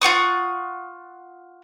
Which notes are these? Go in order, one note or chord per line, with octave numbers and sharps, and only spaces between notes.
F4 F#5 C#6 D#6